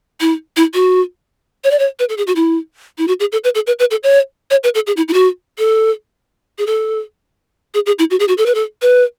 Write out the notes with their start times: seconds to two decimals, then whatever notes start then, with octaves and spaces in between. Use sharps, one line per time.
0.20 E4
0.56 E4
0.74 F#4
1.64 C#5
1.71 D5
1.79 C#5
1.99 B4
2.09 A4
2.17 G#4
2.27 F#4
2.36 E4
2.98 E4
3.07 F#4
3.20 G#4
3.32 A4
3.44 B4
3.55 A4
3.67 B4
3.79 B4
3.91 A4
4.03 C#5
4.51 C#5
4.63 B4
4.74 A4
4.87 G#4
4.97 E4
5.08 E4
5.13 F#4
5.58 A4
6.58 G#4
6.66 A4
7.74 G#4
7.86 G#4
7.99 E4
8.10 F#4
8.19 G#4
8.28 F#4
8.38 A4
8.46 B4
8.54 A4
8.82 B4